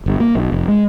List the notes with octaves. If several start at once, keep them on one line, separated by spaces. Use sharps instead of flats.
G1
A#3
B1
F1
G#3